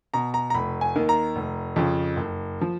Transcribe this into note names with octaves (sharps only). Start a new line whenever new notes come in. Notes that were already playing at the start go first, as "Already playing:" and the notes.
B2 A#5
A#5
A#5
F1 B5
G#5
D#2 D#3
A#5
F1
F2 C#3 F3
F#1
F3